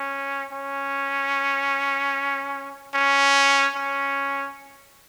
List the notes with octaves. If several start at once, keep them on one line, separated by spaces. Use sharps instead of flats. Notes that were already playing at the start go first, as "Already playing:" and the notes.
Already playing: C#4
C#4
C#4
C#4